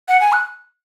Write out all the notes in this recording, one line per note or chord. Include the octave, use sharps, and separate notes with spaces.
F#5
G#5
F#6